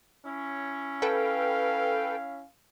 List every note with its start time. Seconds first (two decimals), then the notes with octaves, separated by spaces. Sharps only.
0.25 C#4 E4 C#5
1.02 A4 B4 F5 G5